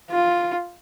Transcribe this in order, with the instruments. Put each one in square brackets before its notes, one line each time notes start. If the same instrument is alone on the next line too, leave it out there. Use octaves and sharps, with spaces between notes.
[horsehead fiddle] F4